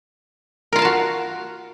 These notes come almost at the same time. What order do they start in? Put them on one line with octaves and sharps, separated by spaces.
A#4 F4 F5 A5 F#4